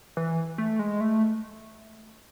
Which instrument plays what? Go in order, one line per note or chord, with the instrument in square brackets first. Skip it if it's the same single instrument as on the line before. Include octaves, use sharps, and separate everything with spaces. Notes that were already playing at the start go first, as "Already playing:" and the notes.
[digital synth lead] E3
A3
G#3
A3